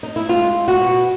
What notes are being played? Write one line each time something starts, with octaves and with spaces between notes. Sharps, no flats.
D#4
E4
G#3 F4
G#3
F#4
B2